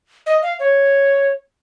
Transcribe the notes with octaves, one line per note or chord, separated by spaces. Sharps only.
D#5
F5
C#5